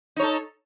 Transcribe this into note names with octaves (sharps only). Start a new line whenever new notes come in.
D#4 A4 C#5